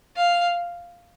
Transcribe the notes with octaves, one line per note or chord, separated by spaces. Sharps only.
F5